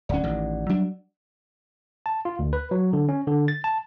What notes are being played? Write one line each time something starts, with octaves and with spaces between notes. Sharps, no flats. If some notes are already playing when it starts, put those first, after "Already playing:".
D1 C#4 D5 F#5
A1 D#3
F#3 G3 D4
A5
F4
D2
B4
F#3
D3
C#4
D3
A6
A5